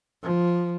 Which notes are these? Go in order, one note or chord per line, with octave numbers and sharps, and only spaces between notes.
F3